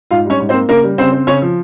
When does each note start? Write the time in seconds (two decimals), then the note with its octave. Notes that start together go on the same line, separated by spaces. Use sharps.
0.11 G#2 F4 F5
0.25 G3 C#4 C#5
0.40 G#2
0.49 C4 C5
0.54 A#3
0.69 C#3 A#3 A#4
0.83 G3
0.98 C#3 C4 C5
1.13 C4
1.27 C#3 C#4 C#5
1.42 F3